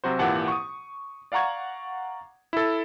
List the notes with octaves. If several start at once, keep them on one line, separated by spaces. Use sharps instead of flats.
C3 F#3 F#4 C5
G#1 A#2 E3 G4 F#5 A5
C#6 D#6
D5 F5 F#5 A#5 C#6 G#6
E4 A4